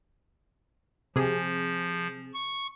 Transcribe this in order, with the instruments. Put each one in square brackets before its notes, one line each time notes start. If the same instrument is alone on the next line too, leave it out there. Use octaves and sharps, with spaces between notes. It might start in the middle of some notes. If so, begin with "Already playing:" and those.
[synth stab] C3 G#4 [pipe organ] F3
[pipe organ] C#6